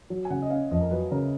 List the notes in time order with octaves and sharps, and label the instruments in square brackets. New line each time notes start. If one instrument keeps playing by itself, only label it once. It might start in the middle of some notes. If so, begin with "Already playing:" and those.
[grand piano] F#3
[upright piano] G#5
[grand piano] C#3 [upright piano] F#5
[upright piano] D#5
[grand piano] C#4 [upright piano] F5
[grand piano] F2 [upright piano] D#5
[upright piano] A#4
[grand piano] F#3 [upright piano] B4
[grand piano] C#3 [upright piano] A#4